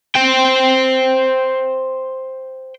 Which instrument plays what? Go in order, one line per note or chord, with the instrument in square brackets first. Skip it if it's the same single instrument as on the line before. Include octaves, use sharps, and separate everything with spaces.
[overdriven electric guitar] C5 G5